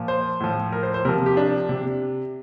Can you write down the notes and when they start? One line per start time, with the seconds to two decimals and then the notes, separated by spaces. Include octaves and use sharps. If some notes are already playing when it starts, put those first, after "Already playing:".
Already playing: A#2 F3
0.08 C5
0.40 A2 F3
0.72 A#4
0.83 C5
0.94 C5
1.05 C3 A#4
1.09 F3
1.26 G4
1.37 D4
1.69 C3